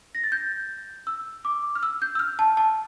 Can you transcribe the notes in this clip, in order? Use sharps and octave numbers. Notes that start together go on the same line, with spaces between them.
A#6
A6
G6
E6
D6
F6
E6
G6
E6
F6
A5
A5